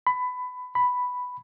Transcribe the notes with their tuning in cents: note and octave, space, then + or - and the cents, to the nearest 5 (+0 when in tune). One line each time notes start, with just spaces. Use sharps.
B5 +20
B5 +5